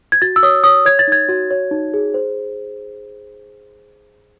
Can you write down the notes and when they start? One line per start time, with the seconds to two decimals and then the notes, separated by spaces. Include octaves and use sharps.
0.12 G#6
0.22 F#4 A6
0.36 E6
0.43 C#5 D#6
0.64 C#5 D#6
0.86 C#5 G#6
0.99 A6
1.08 D#4 G#6
1.29 F#4
1.51 C#5
1.71 D#4
1.94 G#4
2.14 C5